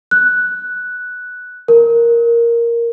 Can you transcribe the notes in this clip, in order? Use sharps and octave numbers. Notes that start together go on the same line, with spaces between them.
F#6
A#4